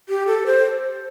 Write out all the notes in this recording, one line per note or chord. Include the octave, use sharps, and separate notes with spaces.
G4
A4
C5